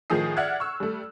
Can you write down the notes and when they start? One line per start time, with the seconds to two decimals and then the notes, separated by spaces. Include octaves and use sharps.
0.10 A2 D#3 F3 G#4 D#6 C7
0.37 D5 E5 F#5 F6 F#6 G#6
0.60 C#6 E6
0.80 G3 A3